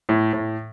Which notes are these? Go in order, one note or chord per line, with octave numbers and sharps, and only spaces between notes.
A2
A2